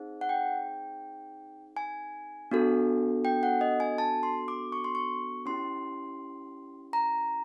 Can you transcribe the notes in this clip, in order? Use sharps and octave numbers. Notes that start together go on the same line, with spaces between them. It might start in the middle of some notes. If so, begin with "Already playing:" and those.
Already playing: C4 D#4 G#4
F#5
G5
G#5
B3 D4 F#4 A4
G5
F#5
D#5
G#5
A5
C6
D6
C#6
C6
C#6
C#4 E4 G4 C6
A#5